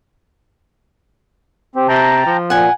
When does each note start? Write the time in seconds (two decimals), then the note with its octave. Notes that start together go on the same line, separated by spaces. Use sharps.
1.76 C4 G4
1.88 C3 G5 A5 A#5
2.26 F3
2.50 A#2 F#5 G#5